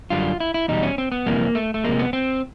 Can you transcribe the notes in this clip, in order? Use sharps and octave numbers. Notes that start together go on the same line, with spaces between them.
F#2 D3 G3 F4
E4
E4
E2 B2 G3 D#4
C#4
C4
B3
F2 C3 E3 G3 A#3
A3
A3
C3 F3 G#3 A#3
B3
C4